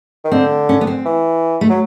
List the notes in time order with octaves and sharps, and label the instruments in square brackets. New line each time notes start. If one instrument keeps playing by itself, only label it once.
[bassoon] D#3
[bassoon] D3 [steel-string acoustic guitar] C4
[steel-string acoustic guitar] C#4
B3
C4
[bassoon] E3
[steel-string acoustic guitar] A3
[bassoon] F#3